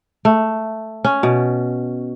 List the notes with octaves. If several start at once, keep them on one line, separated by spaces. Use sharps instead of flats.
A3
C#4
B2